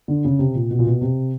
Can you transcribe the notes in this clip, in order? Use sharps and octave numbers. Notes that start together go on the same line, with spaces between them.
D3
C#3
C3
A#2
B2
A#2
B2
C3